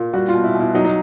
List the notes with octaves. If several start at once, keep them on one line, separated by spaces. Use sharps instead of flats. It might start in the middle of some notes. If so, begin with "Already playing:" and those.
Already playing: A#2
G3 F#4
F4
B2
E4
B2 E4
F#3 D#4
D#4